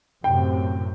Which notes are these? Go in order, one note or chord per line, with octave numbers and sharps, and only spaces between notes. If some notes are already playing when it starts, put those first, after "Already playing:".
F#2 A2 C3 G5